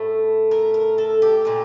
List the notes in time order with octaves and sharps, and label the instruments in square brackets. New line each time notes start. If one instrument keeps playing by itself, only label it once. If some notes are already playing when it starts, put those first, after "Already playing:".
Already playing: [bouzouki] A2 A3
A#4
A#4
A4
G4
A#2 A3 G4